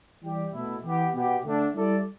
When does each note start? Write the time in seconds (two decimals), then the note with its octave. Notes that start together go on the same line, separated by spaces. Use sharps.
0.21 E3 G3 E4 G4 D5
0.52 B2 A3 E4
0.82 E3 B3 G4
1.13 B2 B3 G4
1.43 D3 A3 D4
1.73 G3 E4 A4 D5